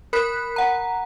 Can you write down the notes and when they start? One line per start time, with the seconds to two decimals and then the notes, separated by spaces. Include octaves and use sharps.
0.13 A#4 B5 F#6 B6
0.56 F#5 A#5